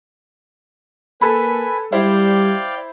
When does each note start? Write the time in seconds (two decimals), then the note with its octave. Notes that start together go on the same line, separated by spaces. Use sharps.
1.21 A#3 A4 B4 G#5 B5
1.92 G3 E4 C5 D5 F5 G5